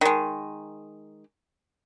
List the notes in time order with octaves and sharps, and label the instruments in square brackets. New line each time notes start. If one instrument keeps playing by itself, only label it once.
[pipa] D#3 G#3